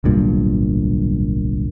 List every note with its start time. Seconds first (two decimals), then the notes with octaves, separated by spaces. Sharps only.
0.04 D1 B1 G2 A#2